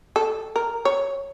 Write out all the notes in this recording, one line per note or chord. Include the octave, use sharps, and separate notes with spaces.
A4
A#4
C#5